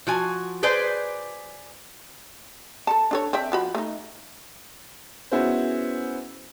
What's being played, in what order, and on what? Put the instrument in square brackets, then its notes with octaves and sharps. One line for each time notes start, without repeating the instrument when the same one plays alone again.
[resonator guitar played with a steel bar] F3 F#4 G#5
G#4 B4 C5 D5 G#5
[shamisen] A4 A5
D4 A4 C#5
C4 D5 E5
F3 F#4 B5
A3 D#4
[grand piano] B3 C#4 E4 F#4 G#4 C5